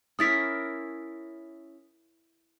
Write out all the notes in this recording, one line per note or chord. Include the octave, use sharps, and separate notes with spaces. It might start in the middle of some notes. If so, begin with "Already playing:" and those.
C#4 E4 A#4 D#6 A6 B6